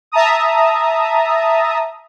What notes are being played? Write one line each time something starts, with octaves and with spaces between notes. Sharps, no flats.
E5 A5 A#5 D#6